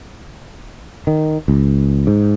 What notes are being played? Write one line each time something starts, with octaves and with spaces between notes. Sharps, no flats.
D#3
C#2
G#2